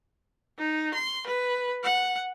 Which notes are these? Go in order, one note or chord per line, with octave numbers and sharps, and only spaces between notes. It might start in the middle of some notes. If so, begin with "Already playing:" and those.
D#4
C6
B4
F#5